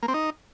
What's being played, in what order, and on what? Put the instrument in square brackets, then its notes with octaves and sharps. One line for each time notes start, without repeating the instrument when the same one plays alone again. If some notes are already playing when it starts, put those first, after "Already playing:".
[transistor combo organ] A#3
C4
D#4